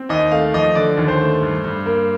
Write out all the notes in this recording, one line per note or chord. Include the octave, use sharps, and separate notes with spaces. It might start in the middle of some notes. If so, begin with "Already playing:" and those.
Already playing: C4
D#2 D#5
A3 F5
F3 D#5
D3 D5
D#2
C5
A3
G2
G2
A#3